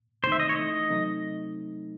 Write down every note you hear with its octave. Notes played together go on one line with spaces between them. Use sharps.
C3 D#3 A3 C4 D#4 C5
E5
D#5
C#5
E3 A3 D#4 D#5
C3 F#3 A3 C4 D#4